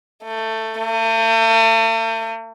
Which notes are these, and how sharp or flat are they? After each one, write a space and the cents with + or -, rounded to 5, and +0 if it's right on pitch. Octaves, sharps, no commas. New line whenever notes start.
A3 +15
A3 +45